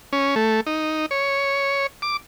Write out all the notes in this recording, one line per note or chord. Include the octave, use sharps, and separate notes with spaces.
C#4
A3
D#4
C#5
D6